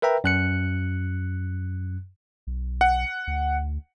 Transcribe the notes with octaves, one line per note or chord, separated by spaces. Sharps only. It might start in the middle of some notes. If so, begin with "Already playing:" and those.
A#4 B4 E5 G5 A#5
F#2 F#6 C#7
B1
F#5
D2